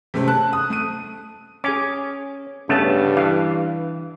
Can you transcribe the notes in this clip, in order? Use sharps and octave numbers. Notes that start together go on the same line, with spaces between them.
C3 G#3 A3 C4 C#4
A5 F#6
D#6
A3 D#7
C#4 G#4 G#5 D6
G2 C#3 A3 B3 C#4 A5
E3 F5